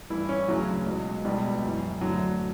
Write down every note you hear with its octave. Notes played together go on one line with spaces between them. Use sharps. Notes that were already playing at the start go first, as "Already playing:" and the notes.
G2 E3 E4
C#4
D2 C#3 E3 F#3
C#2 B2
C#2 B2 G3
F#2 E3
D2 D3 F#3